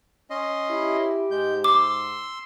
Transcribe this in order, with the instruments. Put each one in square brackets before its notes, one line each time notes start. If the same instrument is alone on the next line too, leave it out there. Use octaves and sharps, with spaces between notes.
[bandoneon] C#4 D#5 C6
[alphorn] E4 [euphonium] G4
[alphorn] G#2 [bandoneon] G#3 G6
[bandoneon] C6 E6 [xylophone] D6